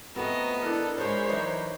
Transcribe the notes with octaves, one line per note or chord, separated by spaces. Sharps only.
F3 A3 B3 C4 F#4 D#5 A#5
D4 E4 A4 A#4
F3 G#3 C5 C#5 B5
E3 F#3 D#4